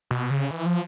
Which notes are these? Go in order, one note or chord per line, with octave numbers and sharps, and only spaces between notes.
B2
C#3
E3
F3